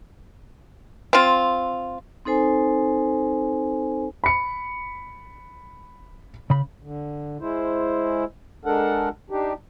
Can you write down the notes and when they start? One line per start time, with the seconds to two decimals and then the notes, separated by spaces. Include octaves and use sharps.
1.13 C4 F4
2.25 C4 D#4 A4 C5 G#5
4.24 B5 C#7
6.50 C#3 B5
6.82 D3
7.41 G#3 E4 C5
8.65 G#3 D4 A4 A#4 F#5
9.30 D4 D#4 G4